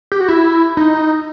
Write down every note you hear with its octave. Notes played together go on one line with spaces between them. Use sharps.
G4
F#4
E4
D#4